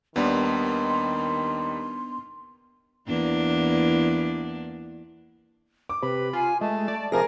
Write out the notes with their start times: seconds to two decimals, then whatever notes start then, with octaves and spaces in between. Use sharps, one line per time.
0.16 D#2 D#3 G3 B3 D4 C6
3.07 E2 A#3 D4
5.89 D6
6.03 C3 B4 B5
6.33 F4 G#5
6.61 G#3 A3 A5
6.88 D5
7.12 C3 F3 G#4 A#4 G#5 A#6